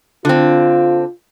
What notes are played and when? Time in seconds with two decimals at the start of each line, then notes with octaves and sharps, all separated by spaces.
0.25 D3 C4 F4